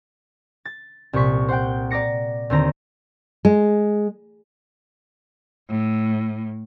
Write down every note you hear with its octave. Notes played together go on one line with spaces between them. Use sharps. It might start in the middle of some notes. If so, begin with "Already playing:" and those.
A6
C2 A#2 F3 C#6 B6
C5 F#5 G5
D5 A#5 D6 A#6 C#7
D#2 D3 C4 A#5
G#3
A2